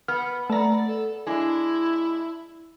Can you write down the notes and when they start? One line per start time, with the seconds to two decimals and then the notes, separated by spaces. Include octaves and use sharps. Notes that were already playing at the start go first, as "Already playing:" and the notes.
0.08 B3 F6
0.50 A3 D5 A#5
0.87 A4
1.27 G#3 D4 E4